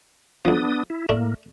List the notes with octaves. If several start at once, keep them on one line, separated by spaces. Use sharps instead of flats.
B1 F3 B3 D4 D#6
E4
A2 A3 A#3 D4